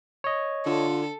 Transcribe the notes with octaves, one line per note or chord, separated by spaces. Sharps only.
C#5 D#5
D3 F4 A4